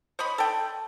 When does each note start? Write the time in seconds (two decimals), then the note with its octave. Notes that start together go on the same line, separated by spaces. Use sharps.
0.19 C5 C#5 D#5 B5
0.38 A4 G5